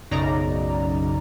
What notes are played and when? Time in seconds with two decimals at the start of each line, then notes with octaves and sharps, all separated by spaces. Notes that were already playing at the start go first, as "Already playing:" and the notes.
0.11 B1 F#2 C#3 D#4 D5 A#5